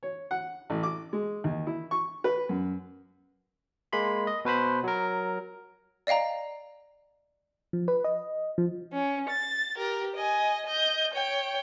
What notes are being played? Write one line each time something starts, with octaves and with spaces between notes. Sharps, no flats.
C#5
F#5
A1
D6
G#3
D#2
E4
C#6
B4
F#2
G#3 A#3 B5 C6
D#5
B2 B4 C5 B5
F#3 A#4
D5 D#5 F5 G5 A#5
F3
B4
D#5
F3
C#4
A6
G4 A#4
D#5 G#5
D#5 G6
C#5 G5